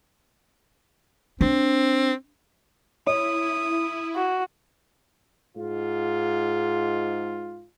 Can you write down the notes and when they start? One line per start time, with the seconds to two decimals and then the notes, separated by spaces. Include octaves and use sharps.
1.41 C4 D4
3.07 E4 C#5 D#6
4.16 F#4
5.56 G#2 F4